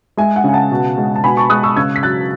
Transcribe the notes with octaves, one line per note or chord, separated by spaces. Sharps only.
G#3 E5 G#5
F#5
C#3 G#5
F#5 A5
B2
G#3
A5
B2 G#5 B5
A5 C#6
G#3 D#6 F#6
C#6 E6
C#3 E6 G#6
B6
F#3 F#6 A6